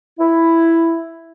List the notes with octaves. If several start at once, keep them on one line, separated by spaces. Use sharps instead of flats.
E4